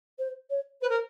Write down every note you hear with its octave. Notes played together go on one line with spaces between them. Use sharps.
C5
C#5
B4 C5
A#4